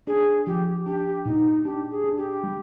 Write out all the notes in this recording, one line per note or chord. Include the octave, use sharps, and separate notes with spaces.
D4 G#4
F3 G4
D4 G4
A#2 D#4
D4 G4
G#4
D4
G4
G3